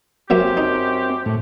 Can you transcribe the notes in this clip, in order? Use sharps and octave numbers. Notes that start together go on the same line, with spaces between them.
F#2 F#3 A#3 C4 G4 E5
D#4
A2